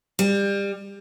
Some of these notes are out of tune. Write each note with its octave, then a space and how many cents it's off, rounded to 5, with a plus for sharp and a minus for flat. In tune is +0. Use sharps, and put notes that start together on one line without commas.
G3 +25